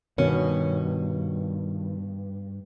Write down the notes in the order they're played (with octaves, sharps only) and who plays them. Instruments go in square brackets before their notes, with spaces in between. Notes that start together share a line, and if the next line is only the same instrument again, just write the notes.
[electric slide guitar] G2 [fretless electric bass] B2 [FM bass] D#3 [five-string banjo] C#4